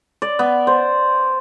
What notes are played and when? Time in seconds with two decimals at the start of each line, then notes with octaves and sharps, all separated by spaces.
0.22 D5
0.39 B3
0.67 C5